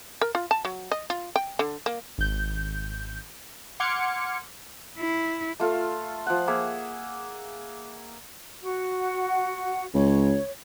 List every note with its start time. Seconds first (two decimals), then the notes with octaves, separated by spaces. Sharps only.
0.21 A#4
0.35 F4
0.51 A5
0.65 F#3
0.91 D#5
1.10 F4
1.36 G5
1.59 D3
1.86 A#3
2.18 G#1 G6
3.80 F#5 C6 D6 F6 G#6 C#7
4.98 E4
5.60 A3 F4 A4 F5
6.27 F3 F#5
6.47 A#3 G#4 E5 F#5
8.63 F#4 F#5
9.94 C#2 C#5